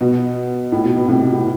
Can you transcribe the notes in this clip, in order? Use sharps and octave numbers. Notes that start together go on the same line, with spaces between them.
B2
A2
B2
B2
A2 C3
A2